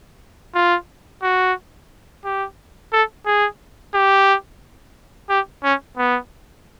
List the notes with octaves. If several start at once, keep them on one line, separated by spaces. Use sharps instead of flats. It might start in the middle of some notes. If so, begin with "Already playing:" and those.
F4
F#4
G4
A4
G#4
G4
G4
C#4
B3